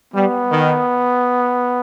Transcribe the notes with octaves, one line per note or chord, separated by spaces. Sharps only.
G3 B3
D#3